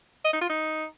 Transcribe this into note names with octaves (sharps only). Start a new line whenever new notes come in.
D#5
D#4
F4
D#4